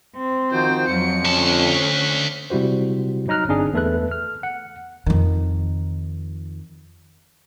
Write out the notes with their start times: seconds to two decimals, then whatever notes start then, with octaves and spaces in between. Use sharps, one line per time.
0.16 C4
0.51 D#3 F3 F#4 C5 G5
0.88 F2 F#3 C#7
1.25 D2 C#4 A5
1.65 B6
2.50 C3 G3 E4 F#4 C5
3.28 F#3 D#4 A#5 F6 F#6
3.48 G1 C4 D4 D#4 G#4
3.73 E2 A3 A4 B4 F#6
4.11 F6
4.43 F#5
5.06 F2 D#3